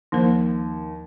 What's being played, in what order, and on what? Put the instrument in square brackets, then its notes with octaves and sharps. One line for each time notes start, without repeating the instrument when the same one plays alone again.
[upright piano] D#2 [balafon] F3 A#3 C5